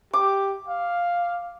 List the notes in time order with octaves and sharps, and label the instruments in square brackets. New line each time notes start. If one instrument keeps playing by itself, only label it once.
[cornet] G4 [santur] D6
[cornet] F5